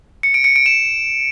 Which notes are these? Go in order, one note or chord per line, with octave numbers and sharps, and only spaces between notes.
C#7
D7
C#7
D7
E7